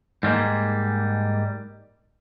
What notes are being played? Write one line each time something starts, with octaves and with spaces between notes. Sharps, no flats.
G#2 G3 G#3 A#3